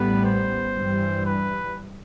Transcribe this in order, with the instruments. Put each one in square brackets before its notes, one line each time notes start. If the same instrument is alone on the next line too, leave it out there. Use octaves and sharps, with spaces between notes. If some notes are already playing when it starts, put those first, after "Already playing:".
Already playing: [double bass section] A1 A2 G3 B3 [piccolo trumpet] B4
[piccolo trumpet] C5
[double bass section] G2 E3 G3
[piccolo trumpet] B4